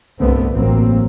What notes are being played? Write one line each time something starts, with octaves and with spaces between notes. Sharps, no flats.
C2 G2 D3 A3 B3 C4
A1 F#3 A#3 C4